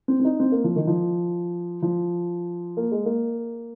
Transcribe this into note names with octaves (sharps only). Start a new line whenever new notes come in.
C4
C4
D#4
C4
A#3
F3
D#3
F3
F3
A#3
G#3
A#3